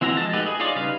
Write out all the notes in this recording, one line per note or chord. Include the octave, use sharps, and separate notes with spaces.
E3 C4 E4 F#4 A#5
F3 G#3 A5
A3 D#4 F#4 G4 B4
G#4
D#4 F4 C#5 D5
C#3 G3 D#4 B4 F5